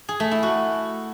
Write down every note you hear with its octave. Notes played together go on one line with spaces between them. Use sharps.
G#4
A3
E4
F#4